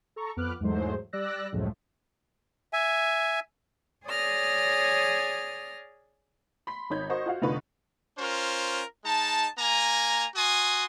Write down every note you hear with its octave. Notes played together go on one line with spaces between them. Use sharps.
A4 A#5 C#6
F2 B3 B4 D6 F6 F#6
E2 G#2 F#3 G#3 A3 C5
G3 D5 E6 F#6 A#6
C#2 F#2 A2 F3 G#3 A3
E5 G#5
G#4 C#5 D5 D#6 F6 A#6
B5 C6 B6
G#1 D#4 C#5 B5 G6 G#6
F#4 A#4 C5 D#5 C#6
F4 F#4 F5
F1 D3 D#4 F4 B4 C#6
C#4 F4 A#4 C5
G#3 D#4 A5
A#3 G#5 A#5
F#4 G#5 C6 D#6